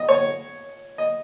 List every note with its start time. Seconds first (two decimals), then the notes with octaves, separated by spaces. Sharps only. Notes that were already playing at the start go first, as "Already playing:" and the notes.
Already playing: D#5
0.09 C#5
0.98 D#5